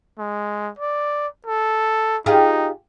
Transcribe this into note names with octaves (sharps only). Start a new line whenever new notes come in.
G#3
D5
A4
D#4 F4 G4 G#4